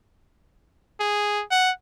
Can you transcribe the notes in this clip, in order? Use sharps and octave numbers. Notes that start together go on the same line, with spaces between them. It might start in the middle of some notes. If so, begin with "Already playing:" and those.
G#4
F#5